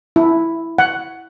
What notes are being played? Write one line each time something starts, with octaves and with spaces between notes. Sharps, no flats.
E4
F#5